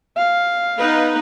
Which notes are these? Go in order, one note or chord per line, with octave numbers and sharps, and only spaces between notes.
F5
B3 D#4 B4